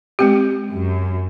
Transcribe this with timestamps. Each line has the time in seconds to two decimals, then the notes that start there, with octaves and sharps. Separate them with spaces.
0.19 G#3 C4 G4
0.70 F#2